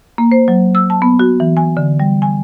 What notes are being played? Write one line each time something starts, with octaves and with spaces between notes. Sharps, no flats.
A#3
C5
F#3
E6
A5
B3
F#4
E3
G#5
D3
G3
G#5